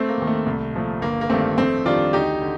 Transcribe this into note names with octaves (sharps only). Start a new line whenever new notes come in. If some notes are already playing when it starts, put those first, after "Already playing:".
Already playing: A3 C4
A#3
D#2 D#3
A3
C2
A#2 F3 A3
G1 A#3
A#3
G2 D#3 A3 C4
F2 A3 C4
D#3 G3 D4 F4
D2 D#4 G4
D3